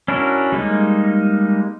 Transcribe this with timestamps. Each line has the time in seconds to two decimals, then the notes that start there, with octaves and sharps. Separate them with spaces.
0.08 C#4 D4 E4 F#4 A#4
0.52 G3 G#3 A#3 D#4